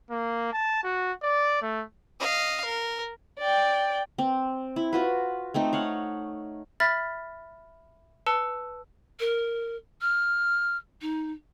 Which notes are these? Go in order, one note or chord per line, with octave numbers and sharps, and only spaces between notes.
A#3
A5
F#4
D5
A3
D#5 F5
A#4
D5 G5
C4
E4
F4 F#4 B4
A3 C4 D#4
C#5 F5 F#5
E5 B5 F6 A6 B6
B4 A5 E6 C#7 G7
A#4
F6
D#4